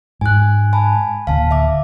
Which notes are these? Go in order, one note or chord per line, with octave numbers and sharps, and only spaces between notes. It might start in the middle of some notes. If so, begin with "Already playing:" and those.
G#2 G#5 F#6
G#5 A5 B5
D1 D3 A#3 F5 A5
E5 D6